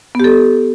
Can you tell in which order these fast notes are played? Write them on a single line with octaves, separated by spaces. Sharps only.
B3 G4 A4